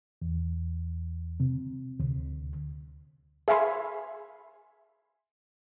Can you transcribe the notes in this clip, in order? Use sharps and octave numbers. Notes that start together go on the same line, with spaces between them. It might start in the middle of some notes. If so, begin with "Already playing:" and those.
E2
C3
D2
G#4 E5 F5 G#5 B5 C6